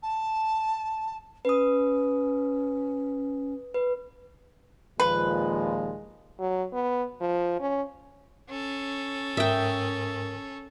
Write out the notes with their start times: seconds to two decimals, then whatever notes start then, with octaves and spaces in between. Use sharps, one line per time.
0.02 A5
1.45 C#4 B4 D#6
3.74 B4
5.00 D#2 A#2 F3 G#3 B4
6.39 F#3
6.73 B3
7.21 F3
7.60 C#4
8.50 C#4 A4
9.37 G#2 A#4 E5 G5 D#6